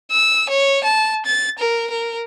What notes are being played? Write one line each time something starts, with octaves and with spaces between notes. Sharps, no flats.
E6
C#5
A5
A6
A#4
A#4